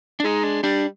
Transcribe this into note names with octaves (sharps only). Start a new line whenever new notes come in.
D4
G#3 D#4
D4
G3 D4